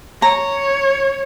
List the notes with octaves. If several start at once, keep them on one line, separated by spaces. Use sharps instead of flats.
C#5 A#5